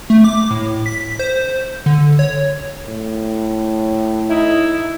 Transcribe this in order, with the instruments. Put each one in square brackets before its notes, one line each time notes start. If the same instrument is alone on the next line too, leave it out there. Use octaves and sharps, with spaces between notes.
[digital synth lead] A3
D6
A2
B6
C5
D3
C#5
[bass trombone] A2
[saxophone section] D#4 E4